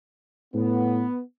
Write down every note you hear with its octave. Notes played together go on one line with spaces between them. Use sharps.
A2 B3